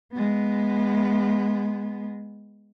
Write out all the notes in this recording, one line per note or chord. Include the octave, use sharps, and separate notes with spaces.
G#3 B3